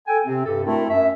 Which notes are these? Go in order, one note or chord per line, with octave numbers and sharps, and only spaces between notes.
A4 G5 G#5
C3 C4
G2 C3 G4 A4
A3 C4 D4 E4 F#4 A#4
F#2 E5